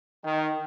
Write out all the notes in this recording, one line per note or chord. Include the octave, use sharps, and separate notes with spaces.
D#3